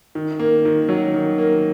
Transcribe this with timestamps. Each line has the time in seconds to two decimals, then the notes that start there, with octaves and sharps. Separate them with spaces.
0.15 D#3
0.39 A#3
0.65 D#3
0.89 F#3
1.14 D#3
1.38 A#3